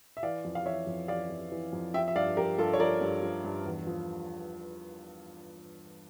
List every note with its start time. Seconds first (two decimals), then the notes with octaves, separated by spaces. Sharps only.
0.17 E5
0.23 E3 D5 F5
0.45 F2
0.55 F5
0.66 E3 C#5 E5
0.87 F2
1.08 E3 D5 F5
1.30 F2
1.52 E3
1.73 F2
1.94 F3 E5 G5
2.08 E5
2.16 G2 D5 F5
2.37 F3 G4 A#4
2.58 G2 F4 A4
2.73 C#5
2.80 F3 A#4 D5
3.01 G2
3.23 F3
3.44 G2
3.66 E2
3.87 F3